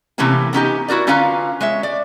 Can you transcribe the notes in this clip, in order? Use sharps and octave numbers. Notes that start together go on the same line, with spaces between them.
C3 E3 A3 A#3 C#4 G4
B3 C#4 D#4 G4
E4 F#4 A#4 D5
D3 C#4 F4 B4 F5 A#5
G#3 C#5 E5
D5